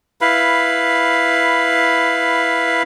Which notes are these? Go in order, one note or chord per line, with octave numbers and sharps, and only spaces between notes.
E4 B4 F5 B5